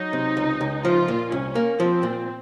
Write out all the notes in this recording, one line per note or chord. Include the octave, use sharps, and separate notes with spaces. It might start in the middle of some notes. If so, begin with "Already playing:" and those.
Already playing: F#3 D#4
C3
C#2
C#2
F3 F4
A#2
C2 C#4
A#3
F3 C4
A#2